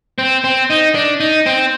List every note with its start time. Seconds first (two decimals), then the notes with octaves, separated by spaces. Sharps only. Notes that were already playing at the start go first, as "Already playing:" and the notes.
0.18 C4
0.44 C4
0.70 D#4
0.95 D4
1.20 D#4
1.46 C4